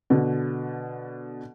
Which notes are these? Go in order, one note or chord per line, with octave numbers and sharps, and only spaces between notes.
B2 D3